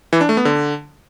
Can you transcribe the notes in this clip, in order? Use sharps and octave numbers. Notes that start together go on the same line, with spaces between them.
E3
D4
A3
B3
D3